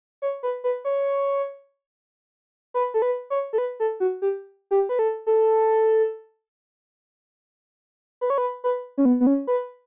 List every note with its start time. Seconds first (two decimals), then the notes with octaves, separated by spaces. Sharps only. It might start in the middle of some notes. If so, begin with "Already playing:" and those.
0.22 C#5
0.43 B4
0.64 B4
0.85 C#5
2.74 B4
2.94 A4
3.02 B4
3.30 C#5
3.53 A4
3.58 B4
3.80 A4
4.00 F#4
4.22 G4
4.71 G4
4.89 B4
4.99 A4
5.27 A4
8.21 B4
8.30 C#5
8.38 B4
8.64 B4
8.98 C#4
9.05 B3
9.20 B3
9.27 C#4
9.47 B4